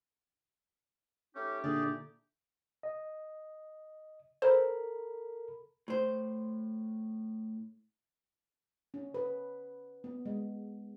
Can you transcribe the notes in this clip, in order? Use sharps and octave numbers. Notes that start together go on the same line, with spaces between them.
A3 C#4 D#4 G4
A#2 D3 G#4 D5
D#5
A4 A#4 C5 B5
A2 C5
C#4
B4
B3
G#3